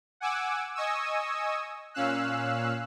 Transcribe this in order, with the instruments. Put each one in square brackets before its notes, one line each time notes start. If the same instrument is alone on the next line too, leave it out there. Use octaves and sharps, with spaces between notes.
[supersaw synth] F#5 G#5 D6 E6
D#5 G#5 C#6 D#6 E6
A#2 C#4 F5 E6 F#6